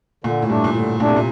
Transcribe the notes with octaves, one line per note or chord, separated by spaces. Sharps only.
A#2 D3
A2
G2 A3 D4
A#2
A2 D3
A#2 A3 D4
C3
A#2